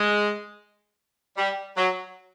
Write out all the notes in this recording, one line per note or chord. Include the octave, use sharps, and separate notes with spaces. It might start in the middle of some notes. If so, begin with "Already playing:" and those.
Already playing: G#3
G3
F#3